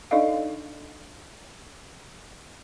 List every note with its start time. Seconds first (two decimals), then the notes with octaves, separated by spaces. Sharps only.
0.11 D4 D#4 A4 D5 D#5 F5